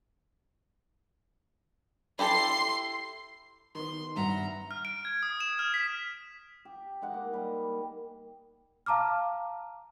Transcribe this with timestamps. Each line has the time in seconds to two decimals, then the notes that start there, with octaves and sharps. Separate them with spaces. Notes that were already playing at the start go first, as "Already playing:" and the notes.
2.19 E4 G4 A4 C6 C7
3.75 D#3 B3 C6
4.16 G2 E5 F#5 A#5
4.71 F6
4.85 D7
5.05 G#6
5.23 D#6
5.40 E7
5.59 F6
5.74 B6
6.65 G4
7.02 G#3 D#4 F#5
7.14 A#3
7.33 G3
8.86 F5 A5 A#5 D6 F6